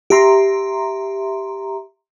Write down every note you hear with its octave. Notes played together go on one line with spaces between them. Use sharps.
G4 E5 A#5 C6